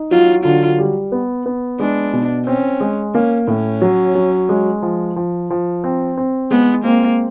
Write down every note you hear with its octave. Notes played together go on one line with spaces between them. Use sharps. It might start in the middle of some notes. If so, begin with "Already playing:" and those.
Already playing: D#4
F#3 F4
D3 F4
G3
B3
B3
G#3 D4
B2
C4 C#4
G#3
A#3 C#4
A2 C#4
F#3
F#3
G#3
F3
F3
F3
C4
C4
G#3 B3
A#3 C4